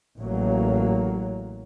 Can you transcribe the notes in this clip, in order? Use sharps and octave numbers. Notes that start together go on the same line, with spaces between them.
A1 F#3 A#3